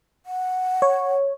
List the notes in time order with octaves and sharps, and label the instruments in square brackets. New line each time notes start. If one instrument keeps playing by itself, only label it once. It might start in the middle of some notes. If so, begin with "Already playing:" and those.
[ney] F#5
[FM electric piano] C#5